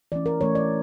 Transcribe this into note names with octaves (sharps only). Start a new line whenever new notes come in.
E3 A3 C#4 D5
A#4
E3 A3 C#4 C#5
D5